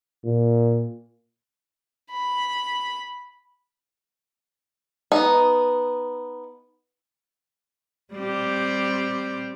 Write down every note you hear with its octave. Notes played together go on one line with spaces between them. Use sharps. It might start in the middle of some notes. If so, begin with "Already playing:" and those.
A#2
B5
B3 D#4
G3 C4 G4